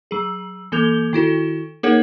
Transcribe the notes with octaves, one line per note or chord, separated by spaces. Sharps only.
F#3 G#4
E3 A#3 A4 G6 F7 G7
D#3 E4 F#4 A4
A#3 D#4 G#4 A#4 C#5 F#5